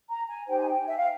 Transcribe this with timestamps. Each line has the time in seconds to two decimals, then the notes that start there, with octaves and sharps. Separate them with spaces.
0.09 A#5
0.28 G#5
0.48 D#4 G4 C5 G5
0.59 G#5
0.68 G5
0.87 E5
0.97 F5